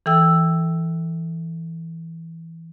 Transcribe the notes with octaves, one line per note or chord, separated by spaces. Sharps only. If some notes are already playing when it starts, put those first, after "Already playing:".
E3 A4 G5 E6